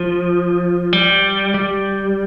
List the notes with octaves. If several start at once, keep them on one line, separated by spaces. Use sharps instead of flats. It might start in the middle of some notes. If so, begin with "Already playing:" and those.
Already playing: F3
G3
G3